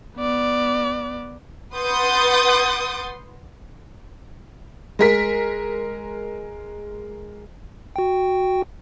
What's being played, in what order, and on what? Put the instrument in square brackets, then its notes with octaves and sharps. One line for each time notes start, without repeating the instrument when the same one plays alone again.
[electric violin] B3 D5
[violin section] B4 F#5 C6 D#6 G6 A6
[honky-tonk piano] G#3 A#4 B6
[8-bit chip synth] F#4 G5